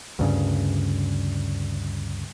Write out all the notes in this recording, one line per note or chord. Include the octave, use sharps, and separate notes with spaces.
D2 G2 C#3